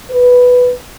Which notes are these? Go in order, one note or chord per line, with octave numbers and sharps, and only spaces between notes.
B4